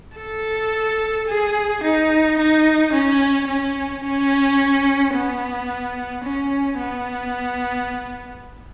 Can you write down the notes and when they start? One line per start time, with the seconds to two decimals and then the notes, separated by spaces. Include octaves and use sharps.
0.18 A4
1.28 G#4
1.84 D#4
2.39 D#4
2.93 C#4
3.48 C#4
4.04 C#4
5.15 B3
6.24 C#4
6.79 B3